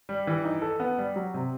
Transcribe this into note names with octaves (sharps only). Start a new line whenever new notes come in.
G3
E3
D#4
A4
B3
G3
F#3
C3